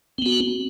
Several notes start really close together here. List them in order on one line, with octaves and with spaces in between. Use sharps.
C4 B3 F#4